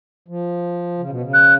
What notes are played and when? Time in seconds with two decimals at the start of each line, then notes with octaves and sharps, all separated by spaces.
0.28 F3
0.98 C#3
1.09 B2
1.22 C#3
1.34 F#6